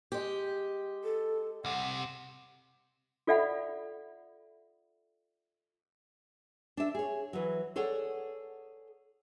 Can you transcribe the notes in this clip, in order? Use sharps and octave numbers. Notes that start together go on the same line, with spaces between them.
G#3 G4
A4
C2 C3 F#5
F4 A4 D5 E5 F#5 B5
D4 E5
G#4 C#5
E3 F#3
G#4 A4 C#5 D5 F#5